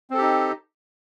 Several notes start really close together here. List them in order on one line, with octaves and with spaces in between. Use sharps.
C4 A4 G4 D#4